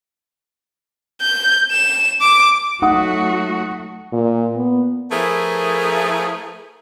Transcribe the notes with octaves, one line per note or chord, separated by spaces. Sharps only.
G6
E7
D6
F#3 A3 D#4 F#4 F#5 D#6
A#2
B3
F3 A3 E4 G#4 A#4 B4